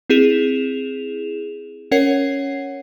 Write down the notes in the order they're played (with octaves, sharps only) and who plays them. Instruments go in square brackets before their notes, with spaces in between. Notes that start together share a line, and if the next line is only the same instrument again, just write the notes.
[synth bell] C4 E4 G#4 E7 F7
C#4 A#4 C#5 F#5 C7